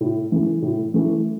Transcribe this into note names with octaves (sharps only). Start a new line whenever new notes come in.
A2
E3 A3
A2
E3 A3